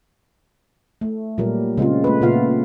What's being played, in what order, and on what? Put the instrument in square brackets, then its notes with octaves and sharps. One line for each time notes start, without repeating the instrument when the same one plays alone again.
[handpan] A3
A#2 F#3 G3 A#4
C#3 G#3 C4 F4
A3 B4
A#2 C#3 B3 F4 F5